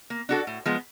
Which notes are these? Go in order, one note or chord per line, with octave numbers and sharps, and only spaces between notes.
A#3
D4 F#4 A4
A2
F3 G#3 B3